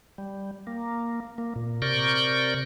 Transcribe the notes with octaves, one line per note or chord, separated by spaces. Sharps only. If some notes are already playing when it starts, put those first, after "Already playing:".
G3
A#3
A#3
A#2
C3 A#4 D5 C#6 G6